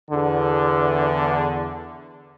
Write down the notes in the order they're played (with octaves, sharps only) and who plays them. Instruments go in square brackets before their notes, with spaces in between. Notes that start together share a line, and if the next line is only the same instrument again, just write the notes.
[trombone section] E2 D3